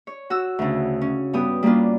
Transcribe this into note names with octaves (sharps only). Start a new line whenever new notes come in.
C#5
F#4 E6
D2 C#3
C#4
G2 B3 G4 D#6
G3 A#3 C#4 D4 F4